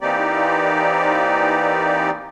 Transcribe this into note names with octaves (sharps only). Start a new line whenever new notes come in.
E3 A#3 C4 D#4 G4 D5